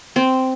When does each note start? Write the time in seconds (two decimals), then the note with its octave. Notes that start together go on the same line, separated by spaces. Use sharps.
0.16 C4